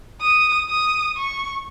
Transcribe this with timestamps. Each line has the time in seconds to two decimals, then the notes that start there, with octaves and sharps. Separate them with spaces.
0.21 D#6
0.69 D#6
1.17 C#6